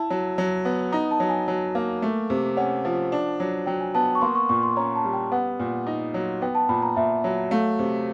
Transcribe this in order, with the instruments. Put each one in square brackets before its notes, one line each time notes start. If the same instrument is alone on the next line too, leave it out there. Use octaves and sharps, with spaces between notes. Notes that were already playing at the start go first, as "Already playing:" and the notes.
Already playing: [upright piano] E4 [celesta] A5
[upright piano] F#3
F#3
B3
[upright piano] D#4 [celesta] A#5
[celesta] A5
[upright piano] F#3
[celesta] G#5
[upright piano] F#3
A#3
A3
C3
[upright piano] C#4 [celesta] F#5
[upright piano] F3
D4
F#3
[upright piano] F#3 [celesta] G5
[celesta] G#5
[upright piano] B3 [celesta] A5
[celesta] C#6
[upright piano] A#3 [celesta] C6
[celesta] C#6
[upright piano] A#2 [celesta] C#6
[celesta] C6
[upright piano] C#4 [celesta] A#5
[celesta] A5
[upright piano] G3
[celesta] G5
[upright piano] B3 [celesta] F#5
[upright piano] A#2
D#4
F#3
[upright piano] B3 [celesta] G5
[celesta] A5
[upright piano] A#2 [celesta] B5
[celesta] A#5
[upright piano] A#2 [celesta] E5
[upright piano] F#3
[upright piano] A3 [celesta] F5
[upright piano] C3